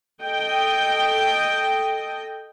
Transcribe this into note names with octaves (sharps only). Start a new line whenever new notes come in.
A4 D#5 G5